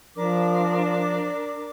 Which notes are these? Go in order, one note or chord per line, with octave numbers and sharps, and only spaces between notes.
F3 D4 A#4 D6